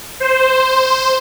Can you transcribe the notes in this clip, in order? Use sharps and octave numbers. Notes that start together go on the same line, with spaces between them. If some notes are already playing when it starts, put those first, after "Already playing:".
C5